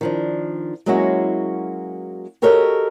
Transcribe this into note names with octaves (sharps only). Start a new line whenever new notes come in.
D#3 F3 D4
F#3 G#3 A#3 C#4 E4 F#4
F#4 G4 A4 A#4 C#5 D#5